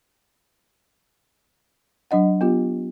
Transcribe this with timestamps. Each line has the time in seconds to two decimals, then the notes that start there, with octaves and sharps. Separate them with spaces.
2.11 F#3 D4 D#5 F#5
2.41 B3 F4 G4